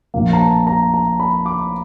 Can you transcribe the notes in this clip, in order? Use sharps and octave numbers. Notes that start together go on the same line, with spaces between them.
A#1 A#2 F3 A#3
A#5
A5
A#5
A#5
B5
D6